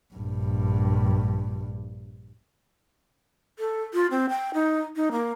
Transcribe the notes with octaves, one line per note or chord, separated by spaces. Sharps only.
A#1 G2
A4
F4
C4
G5
D#4
D#4
A#3